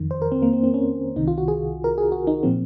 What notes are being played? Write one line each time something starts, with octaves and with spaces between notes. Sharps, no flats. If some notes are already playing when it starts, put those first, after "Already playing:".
Already playing: F2 D#3
C5
A#4
C4
A#3
C4
C4
C#4
C2 C3 D#3 D#4
F4
F#4
G#4
A#4
G#4
F#4
D#4
A#2 F3 C4